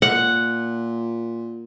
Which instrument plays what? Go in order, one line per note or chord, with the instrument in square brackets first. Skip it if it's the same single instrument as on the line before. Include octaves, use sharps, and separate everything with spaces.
[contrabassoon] A#2 [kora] F#5